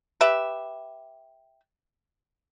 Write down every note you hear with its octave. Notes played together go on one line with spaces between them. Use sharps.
G4 B4 E5